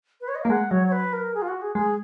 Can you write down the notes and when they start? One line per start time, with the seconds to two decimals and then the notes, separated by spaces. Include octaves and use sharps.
0.21 B4
0.28 C#5
0.35 D#5
0.43 A#3 F5
0.50 G#3 F#5
0.71 F#3 C#5
0.87 C#5
0.92 B4
1.13 A#4
1.34 G#4
1.42 F4
1.48 F#4
1.62 G#4
1.75 G#3 G#4